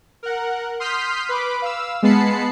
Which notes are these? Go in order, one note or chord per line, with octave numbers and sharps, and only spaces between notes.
A#4 F#5
C6 D#6 F6 G6 B6 C7
B4 B5 D6
F5 E6
G#3 B3 A5 B5 C7 C#7